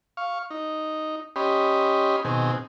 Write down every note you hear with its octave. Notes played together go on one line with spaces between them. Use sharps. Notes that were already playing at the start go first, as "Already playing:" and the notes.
F5 C#6
D#4
C#4 G4 D#5 B5 C6
B2 D#3 C4 G#4